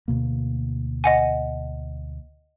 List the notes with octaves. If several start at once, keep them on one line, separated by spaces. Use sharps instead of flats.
D2 B2 A#3
D#5 F#5 G#5